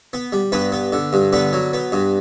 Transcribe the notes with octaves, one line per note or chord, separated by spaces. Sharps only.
B3
G3
G2 B3 B4
B3
D3
G2
D3 B3 B4
F#3
B3
G2